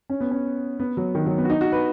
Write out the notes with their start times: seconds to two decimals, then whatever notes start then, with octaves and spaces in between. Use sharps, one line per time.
0.10 C#4
0.20 B3
0.31 C#4
0.80 B3
0.97 F#3
1.15 D#3
1.26 F#3
1.38 B3
1.45 F#4
1.50 D#4
1.61 F#4
1.72 B4